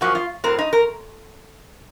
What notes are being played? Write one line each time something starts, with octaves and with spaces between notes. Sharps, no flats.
F#2 F3 A#3 C#4 F#4
F4
A2 F#3 C4 A#4
D#4
A#4